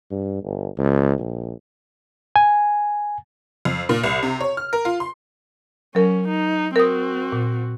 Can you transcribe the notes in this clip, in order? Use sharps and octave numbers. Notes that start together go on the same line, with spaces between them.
G2
G1
C#2
A#1
G#5
F2
A#2
C2
C3
C#5
F6
A#4
F4
C6
F#3 C#4 A#4
D#4
C4 F#4 A#4 D#6
A#2